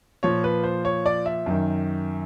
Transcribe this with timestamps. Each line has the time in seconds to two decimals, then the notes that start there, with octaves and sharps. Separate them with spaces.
0.23 A#2 F3 C#5
0.44 B4
0.64 C5
0.85 C#5
1.06 D5
1.26 E5
1.46 F#2 D#3